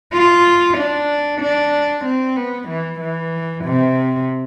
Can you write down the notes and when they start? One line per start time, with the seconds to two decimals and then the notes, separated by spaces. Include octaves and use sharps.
0.13 F4
0.77 D4
1.41 D4
2.05 C4
2.36 B3
2.68 E3
3.00 E3
3.64 C3